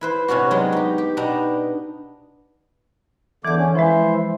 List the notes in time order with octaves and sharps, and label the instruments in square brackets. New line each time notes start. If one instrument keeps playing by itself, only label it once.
[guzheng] E4 B4 C5
C3 C#4 D4 F#4
F#3 G#3 B3 D#4 C6
D#4 G4
G4
B2 B3 D4 D#4 D#5 A#5
[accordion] E2 D3 D6 [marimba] E3 G6
[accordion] C#4
[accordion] E3 E4 C5 [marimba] F3 G#3